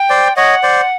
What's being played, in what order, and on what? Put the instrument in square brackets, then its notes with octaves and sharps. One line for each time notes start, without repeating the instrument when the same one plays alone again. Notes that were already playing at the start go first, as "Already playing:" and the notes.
Already playing: [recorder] G5
[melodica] C5 D5
[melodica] C#5 D#5 [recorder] F#5
[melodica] C5 D5